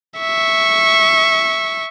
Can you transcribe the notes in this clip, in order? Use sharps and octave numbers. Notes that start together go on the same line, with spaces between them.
E5 C#6